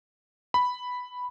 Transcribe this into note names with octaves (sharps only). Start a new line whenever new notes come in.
B5